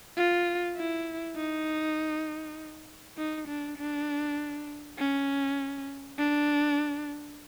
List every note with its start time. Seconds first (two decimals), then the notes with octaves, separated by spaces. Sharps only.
0.17 F4
0.76 E4
1.37 D#4
3.17 D#4
3.48 D4
3.77 D4
4.98 C#4
6.18 D4